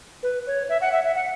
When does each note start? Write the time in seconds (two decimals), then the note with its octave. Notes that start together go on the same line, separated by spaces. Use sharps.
0.23 B4
0.47 C#5
0.69 E5
0.81 F#5
0.92 E5
1.04 E5
1.15 F#5